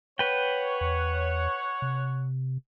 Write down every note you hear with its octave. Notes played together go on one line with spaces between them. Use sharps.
B4 C#5 F#5 G5
E2
C3